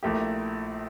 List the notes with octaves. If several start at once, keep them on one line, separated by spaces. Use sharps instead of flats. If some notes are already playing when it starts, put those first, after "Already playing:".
A#1 A#2 A3 E4 G4